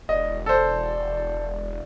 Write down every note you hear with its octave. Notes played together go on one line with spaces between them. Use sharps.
E1 D5 D#5
A4 C5 D5